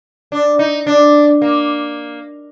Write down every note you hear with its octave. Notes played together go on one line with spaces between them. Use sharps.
D4
D#4
D4
A#3